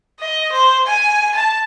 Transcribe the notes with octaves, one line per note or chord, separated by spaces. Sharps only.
D#5
C5
G#5
A5